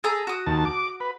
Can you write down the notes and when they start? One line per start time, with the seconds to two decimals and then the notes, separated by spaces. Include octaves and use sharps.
0.04 G#4 A4 A#5
0.27 F#4 D#6
0.46 D#2 A5
0.65 D6
1.00 B4